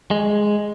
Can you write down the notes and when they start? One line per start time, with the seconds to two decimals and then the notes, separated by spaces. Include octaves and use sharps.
0.11 G#3